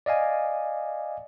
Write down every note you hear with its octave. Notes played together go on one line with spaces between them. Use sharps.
D5 D#5 F5 G#5